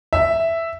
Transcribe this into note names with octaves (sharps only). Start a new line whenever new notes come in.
E5